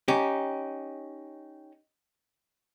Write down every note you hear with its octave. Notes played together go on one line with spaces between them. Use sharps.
C#4 D#4 G4